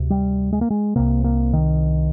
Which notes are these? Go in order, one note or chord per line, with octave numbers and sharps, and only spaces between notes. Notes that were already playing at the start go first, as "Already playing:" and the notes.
Already playing: D2 C3
G3
G#3
A#3
G#3
C2 C3 A#3
A#3
D#3